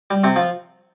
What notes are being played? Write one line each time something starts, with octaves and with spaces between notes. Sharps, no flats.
G3
C3 C4
F3 F4